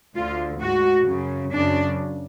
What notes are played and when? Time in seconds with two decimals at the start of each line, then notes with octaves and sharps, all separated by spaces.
0.16 D2 D3 F4
0.62 G#2 F#4
1.09 F#2 C#3
1.54 F#2 C#3 D4